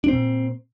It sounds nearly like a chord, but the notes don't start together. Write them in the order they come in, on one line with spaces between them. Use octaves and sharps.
D4 C4 A#2